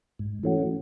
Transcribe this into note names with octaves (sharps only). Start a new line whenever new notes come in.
G#2
E3 A3 C#4 F#4